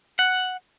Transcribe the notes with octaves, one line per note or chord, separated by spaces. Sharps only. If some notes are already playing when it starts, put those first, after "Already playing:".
F#5